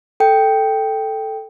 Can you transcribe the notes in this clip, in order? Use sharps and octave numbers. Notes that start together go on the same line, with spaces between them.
A4 G5